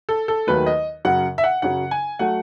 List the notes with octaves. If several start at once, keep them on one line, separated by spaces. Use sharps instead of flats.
A4
A4
D#2 D#3 F#3 A3 B4
D#5
F#2 C#3 F#3 F#5
E5
F#5
F#2 C#3 F#3 F#5
G#5
F#3 A3 F#5